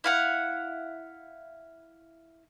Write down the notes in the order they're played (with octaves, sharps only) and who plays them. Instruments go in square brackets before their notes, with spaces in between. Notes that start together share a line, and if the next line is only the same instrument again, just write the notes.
[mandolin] E4 F5 F#5